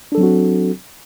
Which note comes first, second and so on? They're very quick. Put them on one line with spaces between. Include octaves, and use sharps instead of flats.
D4 A4 F#3 C4 F#4